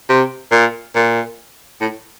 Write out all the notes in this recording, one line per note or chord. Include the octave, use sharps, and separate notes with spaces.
C3
A#2
A#2
A2